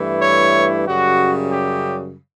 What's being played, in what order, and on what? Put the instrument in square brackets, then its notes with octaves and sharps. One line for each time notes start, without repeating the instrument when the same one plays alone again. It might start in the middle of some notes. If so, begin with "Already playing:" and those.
Already playing: [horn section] G2 E3 A3 E4
C#5
F#2 C#3 G3 F#4
G4